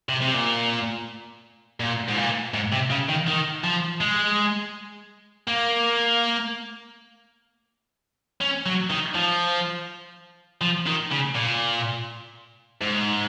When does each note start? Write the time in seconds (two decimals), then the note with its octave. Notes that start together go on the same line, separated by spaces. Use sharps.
0.09 C3
0.22 C3
0.34 A#2
1.80 A#2
2.09 G#2
2.17 A#2
2.54 G#2
2.72 C3
2.90 C#3
3.09 D#3
3.27 D#3
3.64 F3
4.01 G#3
5.47 A#3
8.41 C#4
8.66 F#3
8.90 D#3
9.15 F3
10.61 F3
10.86 D#3
11.11 C#3
11.35 A#2
12.82 G#2